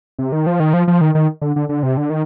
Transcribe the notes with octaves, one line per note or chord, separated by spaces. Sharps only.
C3
D#3
F3
D#3
F3
F3
D#3
D#3
D3
D3
D3
C3
D3
D#3